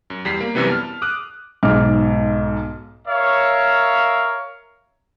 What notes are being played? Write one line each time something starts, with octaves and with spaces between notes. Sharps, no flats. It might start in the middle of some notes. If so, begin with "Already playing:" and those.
F#2
E2 G3 B6 C7
A#3
F#2 C3 E3 G3 B3
A5 F6
D6 D#6 F#6
B1 G#2 D6 F6
A#4 C#5 E5 F5